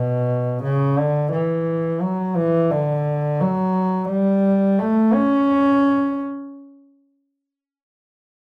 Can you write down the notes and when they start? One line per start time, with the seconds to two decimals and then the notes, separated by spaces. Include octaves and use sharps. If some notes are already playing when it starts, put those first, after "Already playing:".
Already playing: B2
0.63 C#3
0.98 D3
1.32 E3
2.01 F#3
2.36 E3
2.71 D3
3.41 F#3
4.10 G3
4.79 A3
5.13 C#4